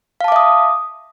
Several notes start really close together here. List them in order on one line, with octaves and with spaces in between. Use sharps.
F5 A5 D6 E5 D#6